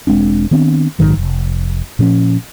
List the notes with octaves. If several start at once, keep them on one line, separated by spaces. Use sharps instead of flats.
E1 G#3 C4 D4
D#3 B3 C4 D4
A#1 G#2 D#3 F#3
F1
A#2 F3 C4 C#4